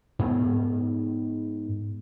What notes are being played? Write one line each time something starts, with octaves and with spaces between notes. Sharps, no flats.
G#2 B3